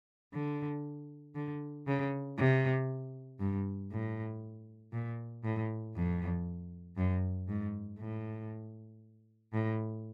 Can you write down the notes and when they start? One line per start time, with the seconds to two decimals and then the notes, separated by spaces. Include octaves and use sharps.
0.34 D3
1.35 D3
1.87 C#3
2.38 C3
3.40 G2
3.91 A2
4.93 A#2
5.44 A2
5.95 F2
6.97 F#2
7.48 G#2
7.99 A2
9.53 A2